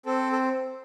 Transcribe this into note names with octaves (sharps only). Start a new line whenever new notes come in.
C4 A4
A4